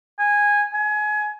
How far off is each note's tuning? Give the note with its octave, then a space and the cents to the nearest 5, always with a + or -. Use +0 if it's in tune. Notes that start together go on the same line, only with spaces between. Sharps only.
G#5 -10
G#5 +25